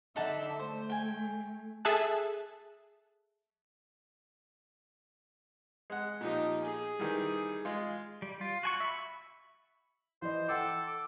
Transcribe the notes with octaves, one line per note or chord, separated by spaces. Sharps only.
D3 D#4 E5 F#5 A5
A3 C5
G5 G#5
G#4 A4 E5 A5 F#6
G#3 F#5
A#2 F3 D#4 G4
G#4 G#5
D#3 E3 G3
G#3 F4
G3
F4
F#4 G#5 C#6
E5 B5
E3 C5 D#5
A4 F#5 G5 D6
D6